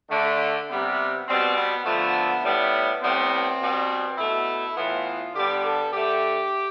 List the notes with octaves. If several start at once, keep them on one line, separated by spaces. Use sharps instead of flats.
D3 A3
C3 G3 B3
B2 G3 B3 C4
B3
D3 F3 A3 B3
A2 G3 B3
A2 G3 B3 C4
B2 G3 B3
B2 A3 E4
A2 E3 B3 F4
D3 G3 B3 G4
A4
D3 A3 G4